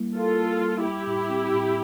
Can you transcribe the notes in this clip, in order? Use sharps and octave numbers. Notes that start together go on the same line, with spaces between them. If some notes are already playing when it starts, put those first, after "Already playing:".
Already playing: G3 A#3 E4
F4 A4 A#4
A#3
G3
G3 E4 G4
A2
C4
A2